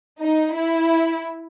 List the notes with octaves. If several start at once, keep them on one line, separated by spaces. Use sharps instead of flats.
D#4
E4